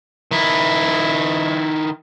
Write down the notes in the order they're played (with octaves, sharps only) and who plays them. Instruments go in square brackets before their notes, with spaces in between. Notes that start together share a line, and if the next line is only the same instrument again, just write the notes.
[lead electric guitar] D#3 E4